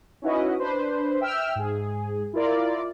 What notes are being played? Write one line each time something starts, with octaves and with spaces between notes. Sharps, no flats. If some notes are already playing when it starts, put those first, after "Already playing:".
C#4 D#4 E4 F#4 B4 D#5
D4 B4 C5
E5 G5 E6 F6
G#2 G#4
E4 F4 A#4 D5